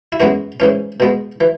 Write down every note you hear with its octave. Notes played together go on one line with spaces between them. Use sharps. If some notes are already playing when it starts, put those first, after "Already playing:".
E4
F#2 E3 G#3 B3 F#4
G#2 E3 C#4
B2 G#3 B3
E3